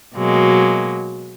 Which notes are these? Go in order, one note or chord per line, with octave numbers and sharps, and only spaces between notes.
B2 F#3 G#3 A#3